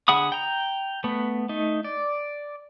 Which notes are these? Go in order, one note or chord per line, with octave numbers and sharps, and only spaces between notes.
D3 G#4 F#5 B5 D#6
G5 A#5
A3 B3
A3 D#4
D5